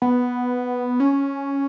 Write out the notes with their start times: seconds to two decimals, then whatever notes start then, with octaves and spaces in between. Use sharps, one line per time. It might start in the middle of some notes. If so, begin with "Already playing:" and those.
0.02 B3
1.00 C#4